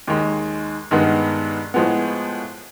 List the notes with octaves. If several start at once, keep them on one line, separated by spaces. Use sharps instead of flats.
D#2 D#3 G#3
G2 D#3 G#3 B3
A2 F3 G#3 B3